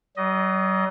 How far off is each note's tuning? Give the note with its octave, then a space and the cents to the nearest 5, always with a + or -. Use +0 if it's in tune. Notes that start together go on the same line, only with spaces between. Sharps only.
F#3 +45 D#5 +0